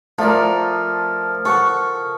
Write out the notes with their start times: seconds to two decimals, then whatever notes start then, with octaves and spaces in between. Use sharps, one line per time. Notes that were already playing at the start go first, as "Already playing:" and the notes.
0.18 F3 A3 A#4 D5
1.45 A4 F#5 C#6